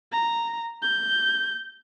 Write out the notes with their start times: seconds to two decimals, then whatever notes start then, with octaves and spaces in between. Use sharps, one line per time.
0.12 A#5
0.82 G6